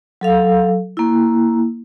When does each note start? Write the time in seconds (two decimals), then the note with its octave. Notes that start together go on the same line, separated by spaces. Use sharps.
0.21 F#3 A4 F5
0.97 A#3 E4